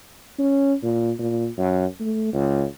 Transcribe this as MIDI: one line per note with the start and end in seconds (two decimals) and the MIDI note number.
0.39 0.73 61
0.83 1.11 46
1.19 1.47 46
1.58 1.85 42
2.00 2.30 57
2.33 2.64 37